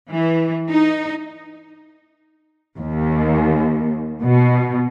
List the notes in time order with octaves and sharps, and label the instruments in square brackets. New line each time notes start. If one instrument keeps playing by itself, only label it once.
[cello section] E3
D#4
D#2
B2